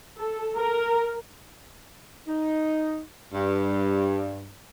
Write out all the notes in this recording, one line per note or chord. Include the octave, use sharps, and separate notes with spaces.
A4
A#4
D#4
G2